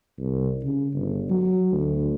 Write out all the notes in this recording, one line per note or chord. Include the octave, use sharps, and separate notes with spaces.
C2
C#3
G1
F#3
D2